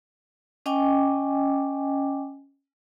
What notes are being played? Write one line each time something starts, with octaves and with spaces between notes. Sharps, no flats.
C#4 D#5 G5 G#5 D6